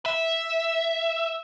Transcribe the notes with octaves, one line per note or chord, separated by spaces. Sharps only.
E5